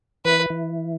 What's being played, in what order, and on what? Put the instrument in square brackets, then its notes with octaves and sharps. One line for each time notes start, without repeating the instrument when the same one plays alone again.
[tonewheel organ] E3 [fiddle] B4
[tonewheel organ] E3